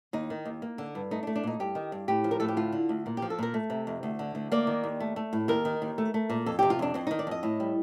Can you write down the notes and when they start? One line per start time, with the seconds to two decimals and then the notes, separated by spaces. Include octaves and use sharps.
0.13 D#2 D#4
0.30 D#3
0.45 D#2
0.62 A#3
0.78 D3
0.95 G2
1.11 A3 D#4
1.23 D4
1.27 A3
1.36 D4
1.43 A#2 D#4
1.60 G2 G4
1.75 D#3
1.92 G2
2.08 A2 G4
2.24 F3
2.31 A#4
2.40 A2 A4
2.48 G4
2.57 D2 F4
2.72 D3
2.89 D2
3.06 A#2
3.17 G4
3.22 F3
3.30 A4
3.39 A#2 A#4
3.54 A3
3.70 C3
3.87 F2
4.03 D2
4.19 D3
4.35 D2
4.52 A#3 D5
4.67 D#3
4.84 D#2
5.00 A3
5.16 A3
5.33 A2
5.48 D#2 A#4
5.65 D#3
5.82 D#2
5.98 A3
6.14 A3
6.30 A#2
6.46 F2 A4
6.59 C3 G4
6.70 F4
6.79 F2 D4
6.94 F2 C4
7.07 D#3 D#4
7.19 D5
7.27 F2 D#5
7.43 A2
7.60 G3